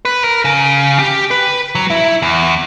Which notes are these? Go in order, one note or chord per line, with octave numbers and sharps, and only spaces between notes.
B4
A#4
C#3
G4
B4
F#3
E4
E2